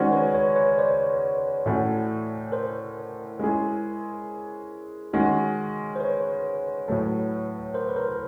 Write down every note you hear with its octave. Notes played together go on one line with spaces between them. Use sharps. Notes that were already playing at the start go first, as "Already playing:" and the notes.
Already playing: D#3 G#3 C#4 F#4 C5 D5
B4 C#5
B4 C#5
B4 C#5
C5 D5
A2 E3 A3 C#4 F#4
A#4 C5
G#3 C#4 E4 G#4
D#3 G#3 C#4 F#4
C5
B4 C#5
A2 F#3 A3
A#4 C5
B4
A#4 C5